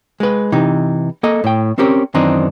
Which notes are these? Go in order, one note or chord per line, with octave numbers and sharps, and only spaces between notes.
G#3 B4
C3 E3 D#4
A#3 A4 D#5
A2 G5
C4 C#4 G4 A#4
F#2 D#3 E3 C4 D4 D#4